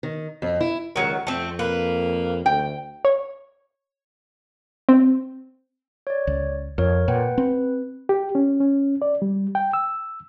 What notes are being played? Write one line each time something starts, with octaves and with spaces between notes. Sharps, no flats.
D#3
F2
E4
C#2 D#3 F#3
F2 A3 C4
A#3 B4
D2 G5
C#5
C4
C#5 D5
C#2
F2 A#4 C#5
A#2 B4 F#5 G5
C4 B4
G4
C#4
C#4
D5
G3
G5
E6